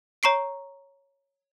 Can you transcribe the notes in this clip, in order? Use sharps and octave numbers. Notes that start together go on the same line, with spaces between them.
C#5 A#5 C#6 C7 D7